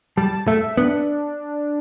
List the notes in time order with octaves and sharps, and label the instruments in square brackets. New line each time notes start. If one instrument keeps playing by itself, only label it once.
[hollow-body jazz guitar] G3 [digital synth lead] A5
[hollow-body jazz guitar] A3 [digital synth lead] E5
[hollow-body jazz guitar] B3 [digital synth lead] D4